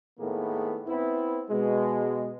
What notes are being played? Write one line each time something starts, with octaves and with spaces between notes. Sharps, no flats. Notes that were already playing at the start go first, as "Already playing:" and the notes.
A2 D#3 A#3 B3 G#4
B3 C4 E4
B2 G#3